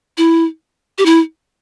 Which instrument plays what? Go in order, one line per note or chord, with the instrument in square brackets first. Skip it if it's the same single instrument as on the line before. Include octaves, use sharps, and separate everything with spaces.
[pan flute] E4
G4
E4